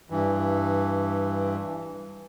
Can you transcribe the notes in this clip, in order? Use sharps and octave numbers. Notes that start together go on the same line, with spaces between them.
G2 E3